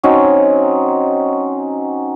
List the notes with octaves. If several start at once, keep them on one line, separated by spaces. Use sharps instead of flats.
F#3 C4 C#4 D#4